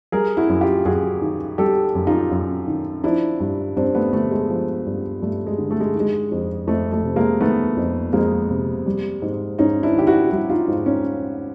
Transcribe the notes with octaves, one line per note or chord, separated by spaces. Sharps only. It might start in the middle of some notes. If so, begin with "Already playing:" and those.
G3 G#4 A#4
E4 F#4
F#2
F4 G4
F#2 F#4 G#4
D#3
G3 G4 A4
F#2
D#4 F4
F#2
D#3
F3 D4 E4
G2
G2 C4 D4
A3 B3
D3 A3
G#3
F3
G2
G2 A3
G#3
D3
A3
G#3
D#3 G#3
F2
F2 A3
A3
C3
G#3 A#3
D#3 A3 B3
F2
F2 G#3 A#3
C3
G3
G#2
G#2 C#4 D#4
D4 E4
D#3 G4
E4 F#4
G3 E4 F#4
D#4 F4
G#2
C#4 D#4